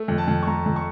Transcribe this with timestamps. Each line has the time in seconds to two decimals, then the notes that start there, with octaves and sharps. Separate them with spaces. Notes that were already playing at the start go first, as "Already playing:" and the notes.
Already playing: A3
0.08 F2
0.18 A5
0.28 F2
0.43 C#6
0.47 F2 A#5
0.66 F2
0.76 C#6